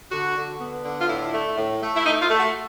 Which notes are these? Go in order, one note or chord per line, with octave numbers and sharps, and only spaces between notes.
D3 F#4
D3
B3
D3
F4
A2 E4
A3
A2
A3
E4
A3 D#4
F4
A3
F#4